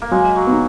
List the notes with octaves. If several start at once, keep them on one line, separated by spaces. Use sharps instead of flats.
A#3
F#3 G#3
F#3
B3 D#4